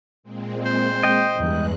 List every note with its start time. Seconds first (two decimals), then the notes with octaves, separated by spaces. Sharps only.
0.23 A#2 G#3 C4
0.65 C5
1.03 D#5 G5
1.36 E2 G2 E3 G#3 F#6